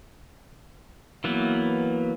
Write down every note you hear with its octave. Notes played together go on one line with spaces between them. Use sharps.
E3 F#3 A#3 B3